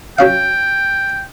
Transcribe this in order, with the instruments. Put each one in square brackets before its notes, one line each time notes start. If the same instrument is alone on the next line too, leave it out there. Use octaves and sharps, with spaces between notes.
[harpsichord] F#3 C#4 F5 [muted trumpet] G5